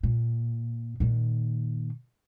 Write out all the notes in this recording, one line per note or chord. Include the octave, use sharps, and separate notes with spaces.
A#2
A#2 D#3